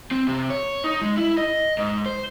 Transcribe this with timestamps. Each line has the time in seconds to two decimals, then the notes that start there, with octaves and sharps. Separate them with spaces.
0.11 C4
0.28 C3
0.50 C#5
0.84 D#4
1.02 G#3
1.17 E4
1.38 D#5
1.78 G#2
2.06 C5